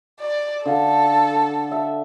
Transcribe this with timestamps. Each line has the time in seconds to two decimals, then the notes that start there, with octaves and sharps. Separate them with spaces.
0.20 D5
0.66 D3 A4 F5 A5
1.72 E5